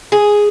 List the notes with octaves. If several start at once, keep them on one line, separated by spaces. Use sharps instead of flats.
G#4